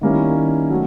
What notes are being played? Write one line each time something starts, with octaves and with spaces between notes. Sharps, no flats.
D#3 G3 A#3 C#4 E4
F#3 A3